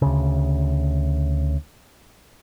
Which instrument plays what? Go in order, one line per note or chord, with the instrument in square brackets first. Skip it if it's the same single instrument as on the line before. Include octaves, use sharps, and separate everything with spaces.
[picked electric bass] D2 C#3